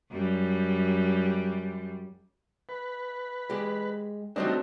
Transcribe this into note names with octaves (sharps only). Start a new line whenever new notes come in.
F#2 G3
B4
G#3 G4
F#3 G3 A3 C4 D4 D#4